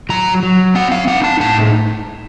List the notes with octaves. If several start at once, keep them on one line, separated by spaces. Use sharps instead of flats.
F#3 A#5
F#3
C4 F#5
F5
D#4 F#5
A5
A2 A5